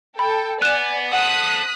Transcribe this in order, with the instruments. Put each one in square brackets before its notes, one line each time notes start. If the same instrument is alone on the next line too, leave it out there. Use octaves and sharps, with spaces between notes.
[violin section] A4 G5 [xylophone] B5
[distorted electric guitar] B3 [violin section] D5 G#5 [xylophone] F#6 E7
[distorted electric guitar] A4 C5 [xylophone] F#5 [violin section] D#6 F#6 B6